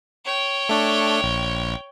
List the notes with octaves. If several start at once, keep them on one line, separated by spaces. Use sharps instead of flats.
C#5 G5
A3 D4
A#1